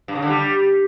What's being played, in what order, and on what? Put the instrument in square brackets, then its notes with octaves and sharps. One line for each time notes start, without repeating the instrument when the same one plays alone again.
[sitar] G2
C#3
D3
G3